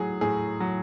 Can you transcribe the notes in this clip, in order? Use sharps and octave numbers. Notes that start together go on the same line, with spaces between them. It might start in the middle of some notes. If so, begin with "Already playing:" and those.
Already playing: A2 F#3 G#4
A2 G#4
F#3